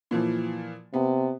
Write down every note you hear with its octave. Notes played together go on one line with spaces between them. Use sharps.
A#2 E3 F3
C3 B3